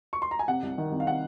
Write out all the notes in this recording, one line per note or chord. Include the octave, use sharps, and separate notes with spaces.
C#6
C6
A#5
G#5
C3 F#5
C2
D#3
C2
F5
C3 F#5